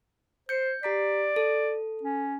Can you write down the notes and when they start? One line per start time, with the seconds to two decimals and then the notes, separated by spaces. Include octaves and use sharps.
0.49 C5 G6 C#7
0.83 G4 D5 A#5 B6
1.36 A4
2.03 C#4